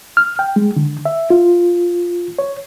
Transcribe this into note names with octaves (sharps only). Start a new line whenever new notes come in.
F6
G5
G#3
D3
E5
F4
C#5